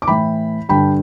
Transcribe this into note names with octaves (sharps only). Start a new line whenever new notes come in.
D6
A2 E3 G5 B5
G2 D3 G5 B5